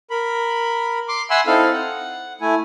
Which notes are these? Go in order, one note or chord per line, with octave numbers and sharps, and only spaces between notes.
A#4 B5
C6 D6
E5 F#5 G#5 B5 C6 E6
C4 D#4 E4 A4 F5
F#5
A3 E4 G#5